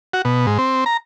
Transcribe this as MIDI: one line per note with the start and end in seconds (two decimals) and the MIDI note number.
0.13 0.22 66
0.25 0.46 47
0.47 0.58 44
0.58 0.84 60
0.86 0.97 82